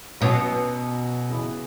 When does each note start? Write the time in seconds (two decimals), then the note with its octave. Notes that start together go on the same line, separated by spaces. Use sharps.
0.21 B2 F#3 C#4 F#4
1.29 C#3 E3 B3